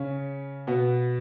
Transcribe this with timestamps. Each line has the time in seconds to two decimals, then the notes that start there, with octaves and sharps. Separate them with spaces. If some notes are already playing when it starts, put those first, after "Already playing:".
Already playing: C#3 C#4
0.67 B2 B3